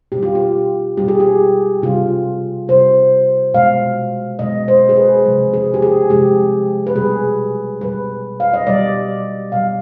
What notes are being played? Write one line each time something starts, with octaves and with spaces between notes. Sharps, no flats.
B2 G3 G4
F4
G4
B2 G3 G4
G#4
G4
C3 G3 F4
C3 G3 C5
B2 G#3 F5
B2 G#3 D#5
C5
G#4
B4
C3 F3 G#3
G#4
G4
G#4
C3 F3 G#3 G4
B4
B2 G3 G#4
B2 G3 B4
F5
D#5
B2 G3 D5
B2 G3 F5